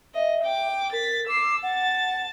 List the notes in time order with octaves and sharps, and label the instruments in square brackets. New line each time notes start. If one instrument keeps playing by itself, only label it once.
[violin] D#5 [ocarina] E5
[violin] G5 D6
[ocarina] A#4 [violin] A6 B6
[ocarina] D6 [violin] E6 C7
[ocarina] F#5 [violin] A5 A6